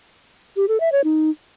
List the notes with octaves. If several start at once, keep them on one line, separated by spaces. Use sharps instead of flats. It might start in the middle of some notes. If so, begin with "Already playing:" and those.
G4
A4
E5
C#5
D#4